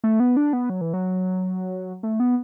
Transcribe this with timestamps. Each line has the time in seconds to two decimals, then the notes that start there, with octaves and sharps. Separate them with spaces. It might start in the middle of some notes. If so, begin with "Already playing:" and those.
0.04 A3
0.20 B3
0.37 D4
0.53 B3
0.70 F#3
0.81 E3
0.93 F#3
2.03 A3
2.20 B3